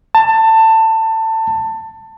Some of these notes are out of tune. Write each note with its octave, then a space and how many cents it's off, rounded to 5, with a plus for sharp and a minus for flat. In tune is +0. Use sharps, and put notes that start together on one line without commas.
A5 +20